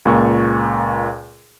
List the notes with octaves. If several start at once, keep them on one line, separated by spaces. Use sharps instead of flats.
C#2 A#2 C#6